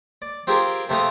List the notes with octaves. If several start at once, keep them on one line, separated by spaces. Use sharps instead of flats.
D5
C4 F4 G4 G#4 A#4
C3 A3 C4 F5 D#6